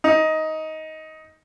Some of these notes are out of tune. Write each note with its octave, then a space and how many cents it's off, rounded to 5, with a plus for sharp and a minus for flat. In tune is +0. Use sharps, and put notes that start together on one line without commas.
D#4 +15